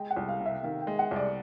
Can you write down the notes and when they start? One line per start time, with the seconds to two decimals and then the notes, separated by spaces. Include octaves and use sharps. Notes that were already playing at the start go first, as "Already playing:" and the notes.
Already playing: G#3 G5
0.11 F#5
0.16 C2
0.28 F5
0.40 C3
0.46 E5
0.63 D#3 F5
0.81 G5
0.87 G#3
0.99 F#5
1.11 C2 D5